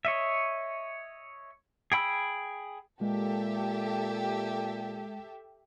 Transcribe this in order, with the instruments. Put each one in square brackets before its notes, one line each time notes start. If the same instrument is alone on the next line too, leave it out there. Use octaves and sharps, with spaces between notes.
[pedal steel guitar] C#5 D#5 E5
G#4 G5 B5 E6
[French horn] A#2 [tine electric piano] G#3 [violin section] G4 A4 E5